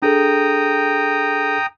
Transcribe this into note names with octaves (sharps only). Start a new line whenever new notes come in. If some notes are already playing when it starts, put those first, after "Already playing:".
D4 G#4 A4 G5 A#5 D#6